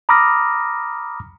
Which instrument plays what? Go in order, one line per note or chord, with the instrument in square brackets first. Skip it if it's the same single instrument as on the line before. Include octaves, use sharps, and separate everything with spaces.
[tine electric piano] A#5 B5 D6 D#6 F6 A#6